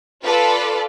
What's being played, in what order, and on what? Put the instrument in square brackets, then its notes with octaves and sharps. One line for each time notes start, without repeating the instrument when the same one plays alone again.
[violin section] F4 A4 B4 D5